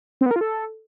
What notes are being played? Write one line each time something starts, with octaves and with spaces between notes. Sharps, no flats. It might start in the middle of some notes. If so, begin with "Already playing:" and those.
C4
B3
A#4
F4
A4